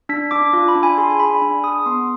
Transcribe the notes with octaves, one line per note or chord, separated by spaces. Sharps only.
D4 B6
D4 D6
F4
B5
D4
G#5
G#4 C6
G#5
D4 B5
D4
G#4 D#6
B3 C6